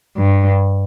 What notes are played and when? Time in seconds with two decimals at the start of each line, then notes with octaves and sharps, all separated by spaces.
0.17 G2